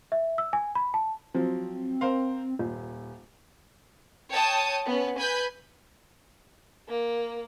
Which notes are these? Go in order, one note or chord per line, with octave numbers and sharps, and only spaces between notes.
E5
E6
G#5
B5
A5
F3 F#3 C4
A#4 C5 F5
D#1
C#5 G5 A5 D#6
B3 C#4
B4 G#5 B5 G6
A#3